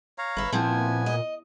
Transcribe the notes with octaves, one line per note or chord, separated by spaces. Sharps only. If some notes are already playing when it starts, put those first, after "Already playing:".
C#5 F5 A#5
G1 B4 E5
A#2 F3 B3 C4 E4 G#5
D#5